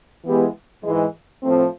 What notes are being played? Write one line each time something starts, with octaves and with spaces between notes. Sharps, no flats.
E3 G#3 B3 E4 G4
G#2 E3 G#3
A2 F3 A3 C4